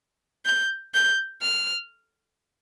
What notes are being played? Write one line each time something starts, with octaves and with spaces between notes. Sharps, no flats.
G6
G6
F6